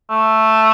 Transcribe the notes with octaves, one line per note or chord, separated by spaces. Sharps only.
A3